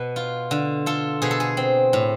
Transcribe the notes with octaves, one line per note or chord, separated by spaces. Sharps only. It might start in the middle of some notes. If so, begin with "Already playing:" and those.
Already playing: B2 B4
F4
D3
F4 A4
B2 G#4
A4
G#4
C4
A2